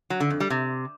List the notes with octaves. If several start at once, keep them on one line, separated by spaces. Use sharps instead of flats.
F#3
D3
F2
G3
C3